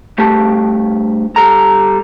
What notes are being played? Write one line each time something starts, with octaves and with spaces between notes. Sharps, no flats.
G2 A3 G4 A5
G3 A4 A#5